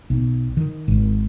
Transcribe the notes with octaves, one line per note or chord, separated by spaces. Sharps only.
B1
D#3
G#1